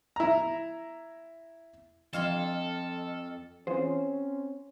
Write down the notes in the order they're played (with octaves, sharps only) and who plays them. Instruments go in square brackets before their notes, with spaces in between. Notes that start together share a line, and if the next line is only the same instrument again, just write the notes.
[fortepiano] E4 A#5
[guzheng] F2 F5 C6 [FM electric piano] F3 D#5 F6 [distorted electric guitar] A4
[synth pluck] E3 F4 G#4 [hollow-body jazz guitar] C4 C5 [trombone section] C#4